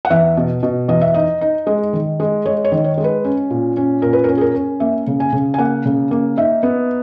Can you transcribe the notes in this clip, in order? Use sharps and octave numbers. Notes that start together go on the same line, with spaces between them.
F#5
E2 E5
B2
B2
E2 D#5
E5
D#4 D#5
D#4
G#3
D#3
G#3
G#3 C#5
C#5
D#3
C#5
G#3
B4
C#4
A#2
C#4
A#2 A#4
B4
A#4
C#4
G#4
A#4
C#4
A#3 E5
C#3
G#5
C#3
G#5
A#3 F#5
C#3
A#3
D#4 E5
B3